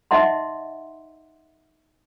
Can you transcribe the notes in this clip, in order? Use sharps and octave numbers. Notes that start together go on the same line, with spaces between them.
D#4 D#5 E5 F#5 C6